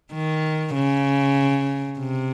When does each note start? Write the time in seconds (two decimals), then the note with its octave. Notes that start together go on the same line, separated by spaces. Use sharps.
0.12 D#3
0.74 C#3
1.99 C3